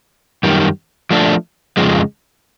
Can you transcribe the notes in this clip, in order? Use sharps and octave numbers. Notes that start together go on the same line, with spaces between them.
F#2 D#3 G3
F3 A3 D4
F2 C#3 F3 G#3